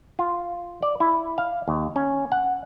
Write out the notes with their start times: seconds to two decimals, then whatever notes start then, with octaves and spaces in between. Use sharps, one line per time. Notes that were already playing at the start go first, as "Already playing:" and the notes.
0.19 F4
0.82 D5
1.00 E4
1.38 F5
1.68 D#2
1.96 C#4
2.32 F#5